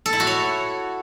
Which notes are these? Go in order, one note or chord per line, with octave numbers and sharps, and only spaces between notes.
A4
E4
F#4
C#5